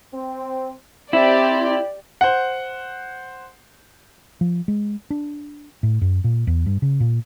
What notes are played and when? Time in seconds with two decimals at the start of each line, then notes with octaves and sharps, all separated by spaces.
0.13 C4
1.13 C4 E4 G4 D5
2.21 C5 F#5
4.41 F3
4.68 G#3
5.10 D4
5.83 A2
6.01 F#2
6.24 A#2
6.47 E2
6.66 G2
6.82 C#3
7.00 A#2